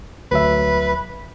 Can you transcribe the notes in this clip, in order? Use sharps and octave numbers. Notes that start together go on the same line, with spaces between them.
D2 F#3 B4 E5